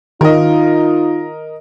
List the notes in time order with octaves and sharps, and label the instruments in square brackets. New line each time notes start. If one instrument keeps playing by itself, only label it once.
[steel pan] D#3 [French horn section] D#4 F4 [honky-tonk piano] A#4 D#5